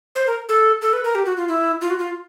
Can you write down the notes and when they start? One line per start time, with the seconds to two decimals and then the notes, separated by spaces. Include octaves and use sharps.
0.15 C5
0.27 A#4
0.49 A4
0.82 A4
0.93 B4
1.05 A#4
1.15 G4
1.26 F#4
1.37 F4
1.49 E4
1.81 F4
1.90 F#4
1.99 F4